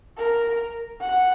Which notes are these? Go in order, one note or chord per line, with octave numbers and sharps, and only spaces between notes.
A#4
F#5